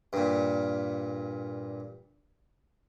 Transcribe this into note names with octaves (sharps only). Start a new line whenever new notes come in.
G2 A#2